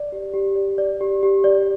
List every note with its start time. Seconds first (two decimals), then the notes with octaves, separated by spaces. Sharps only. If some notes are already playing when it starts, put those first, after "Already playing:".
Already playing: D5
0.12 G4
0.34 G4
0.55 D5
0.78 D5
1.01 G4
1.23 G4
1.44 D5